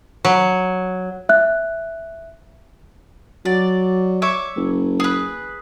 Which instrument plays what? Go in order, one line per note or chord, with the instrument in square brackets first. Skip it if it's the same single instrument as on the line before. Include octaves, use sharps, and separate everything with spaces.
[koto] F#3
[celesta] E5 F#6
[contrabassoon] F#3 [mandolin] D5
[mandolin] C#5 E5 D6
[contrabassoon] F#1
[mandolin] G#4 B4